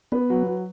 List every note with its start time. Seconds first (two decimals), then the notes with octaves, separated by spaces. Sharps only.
0.12 B3 B4
0.30 F#3
0.47 F#3